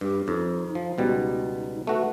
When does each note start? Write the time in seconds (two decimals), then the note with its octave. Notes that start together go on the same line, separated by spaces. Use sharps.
0.01 G2 G4
0.28 F2 D#4
0.75 F3
0.98 C#2 B2 G3
1.87 A3 F#4 B4